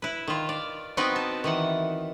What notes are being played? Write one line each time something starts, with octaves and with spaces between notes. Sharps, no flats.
E4 B4
D#3 F4
D5
B3 C4 D#4 F#4 B4 G5
A5
D#3 E3 F#5